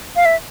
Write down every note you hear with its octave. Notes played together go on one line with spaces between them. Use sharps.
F5
E5